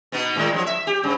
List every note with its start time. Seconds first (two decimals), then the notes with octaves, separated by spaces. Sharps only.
0.12 B2 B3 D#4
0.36 A2 D#3 G#3
0.54 F3 F#3
0.66 E5
0.87 G4
1.03 G2 C#3